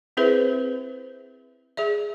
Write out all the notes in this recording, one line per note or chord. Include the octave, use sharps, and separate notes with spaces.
C4 E4 G#4 B4 C5 E5
G#4 D5 E5